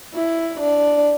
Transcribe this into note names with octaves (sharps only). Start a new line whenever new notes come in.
E4
D4